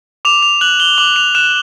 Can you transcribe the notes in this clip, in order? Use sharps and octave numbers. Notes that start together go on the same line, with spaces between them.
D6 F7
F7
F#6 F#7
G7
D6 F#7
F7
F#6 E7